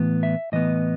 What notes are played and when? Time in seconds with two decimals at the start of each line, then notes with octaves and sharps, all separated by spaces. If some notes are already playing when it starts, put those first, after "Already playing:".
Already playing: A2 E3 B3
0.23 E5
0.52 A2 E3 B3 D#5